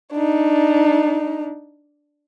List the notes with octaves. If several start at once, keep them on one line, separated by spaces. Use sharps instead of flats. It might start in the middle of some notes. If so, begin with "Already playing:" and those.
D4 D#4